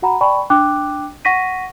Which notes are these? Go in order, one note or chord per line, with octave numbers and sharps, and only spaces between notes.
F#4 F#5 A#5 B5
D5 G5 A5 B5 C#6
D4 G5 D6 F#6
F#5 C#6 A#6 B6 D#7